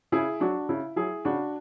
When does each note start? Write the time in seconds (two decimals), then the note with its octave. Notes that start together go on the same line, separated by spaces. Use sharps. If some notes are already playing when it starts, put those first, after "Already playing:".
0.12 C#3 E4 G#4
0.40 F#3 D4 F#4
0.69 C#3 E4
0.96 F#3 E4 G#4
1.25 C#3 D4 F#4